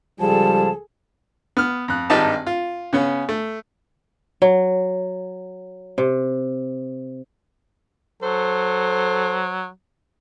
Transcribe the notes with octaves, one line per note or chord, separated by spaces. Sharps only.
C#2 F3 G3 G#4 A4 A5
B3 F6
F2 F#6
G#1 G2 D#4 G4 A5
F4
C#3 B3 C#4
A3
F#3
C3
F#3 A4 C5